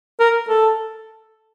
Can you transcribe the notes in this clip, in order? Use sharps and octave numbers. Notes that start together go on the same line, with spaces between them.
A#4
A4